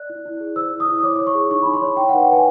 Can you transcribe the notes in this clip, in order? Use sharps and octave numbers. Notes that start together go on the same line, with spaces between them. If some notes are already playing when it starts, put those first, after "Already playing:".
Already playing: D5 F#6
E4
E4
G#4
C5 E6
E4
D#6
E4
D#6
C#5 D6
C#5 D6
C#6
G#4
D#4 C#6
D#4 B5
C6
C#5
D#4 G5
F#5
B4
G5
B4 G#5